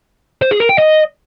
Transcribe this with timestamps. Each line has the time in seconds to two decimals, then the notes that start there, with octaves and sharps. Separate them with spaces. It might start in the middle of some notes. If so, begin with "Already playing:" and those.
0.42 C5
0.51 G#4
0.60 A#4
0.69 G5
0.78 D#5